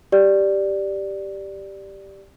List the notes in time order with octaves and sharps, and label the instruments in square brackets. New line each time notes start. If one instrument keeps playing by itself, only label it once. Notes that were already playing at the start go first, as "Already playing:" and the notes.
[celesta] G4 D5